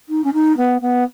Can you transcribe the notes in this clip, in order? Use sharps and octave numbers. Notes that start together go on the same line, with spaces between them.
D#4
C#4
D#4
B3
B3